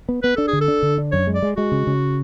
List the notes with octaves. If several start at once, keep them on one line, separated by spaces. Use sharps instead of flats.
B3
B3 B4
D4 A4
G#4
D3
A4
D4
D3
D4
F#2 C#5
G#3
D5
G#3
G#3 F#4
C#3
C#3